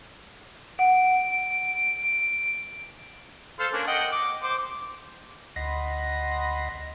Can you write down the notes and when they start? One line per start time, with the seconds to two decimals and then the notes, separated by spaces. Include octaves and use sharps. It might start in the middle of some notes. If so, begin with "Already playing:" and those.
0.79 F#5 D7
3.59 A4 C5 F5
3.73 A#3 C#4 D4
3.87 D#5 F#5 G5
4.12 D6
4.43 C5 D6
5.56 D2 D#5 F#5 B5 C6 A#6